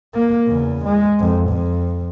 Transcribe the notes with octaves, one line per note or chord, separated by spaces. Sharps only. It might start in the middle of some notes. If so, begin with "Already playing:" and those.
A#3
E2 C#3
G#3
F2
F2